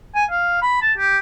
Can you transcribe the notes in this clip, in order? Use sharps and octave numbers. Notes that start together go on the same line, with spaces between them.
G#5
F5
B5
A5
G4